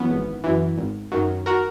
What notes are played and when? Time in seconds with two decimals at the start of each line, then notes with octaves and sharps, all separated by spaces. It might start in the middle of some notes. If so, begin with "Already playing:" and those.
Already playing: F#2 E3 B3 C#4
0.10 G#1
0.44 F#2 E3
0.77 G#1
1.12 F#2 D#3 F#3
1.46 F#4 A#4